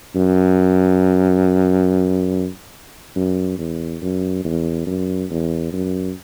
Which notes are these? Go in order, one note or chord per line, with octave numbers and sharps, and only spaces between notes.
F#2
F#2
E2
F#2
E2
F#2
E2
F#2